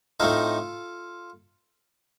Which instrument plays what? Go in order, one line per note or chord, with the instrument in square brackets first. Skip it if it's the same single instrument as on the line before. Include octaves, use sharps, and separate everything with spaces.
[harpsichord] A2 A3 C4 D#4 F4 A4